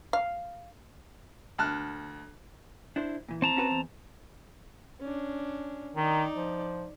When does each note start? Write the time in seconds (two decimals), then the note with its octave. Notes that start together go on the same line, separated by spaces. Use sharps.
0.13 F5
1.58 D2 A5 F6 F#6
2.96 D4 E4 C5
3.28 A#2 E3
3.42 C4 A5 A#5
3.57 C#4 F#4 B4
3.71 E2
5.00 C#4 D4
5.96 D#3 D#4 D5
6.36 F3